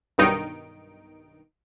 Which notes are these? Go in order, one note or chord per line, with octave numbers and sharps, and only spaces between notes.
B1 G2 D#3 D#4 D7